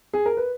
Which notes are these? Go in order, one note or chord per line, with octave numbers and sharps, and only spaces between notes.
G#4
A#4
B4